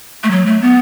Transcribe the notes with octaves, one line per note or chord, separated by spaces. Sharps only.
A3
F#3
A3
B3